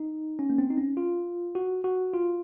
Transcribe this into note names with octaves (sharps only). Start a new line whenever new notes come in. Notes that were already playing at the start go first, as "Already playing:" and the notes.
Already playing: D#4
C#4
A#3
C4
D#4
C#4
F4
F#4
F#4
F4